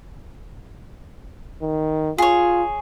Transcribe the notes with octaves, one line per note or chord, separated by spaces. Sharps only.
D#3
F4 G#4 C#5